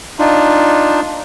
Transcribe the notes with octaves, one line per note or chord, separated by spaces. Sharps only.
D4 D#4 F4